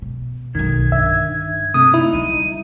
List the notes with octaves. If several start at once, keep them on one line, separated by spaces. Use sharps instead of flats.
B2
B1 F#2 D#3 G#6
G2 D3 E5
C3 A3 D#6
D#4 E4
D3 G3 D#7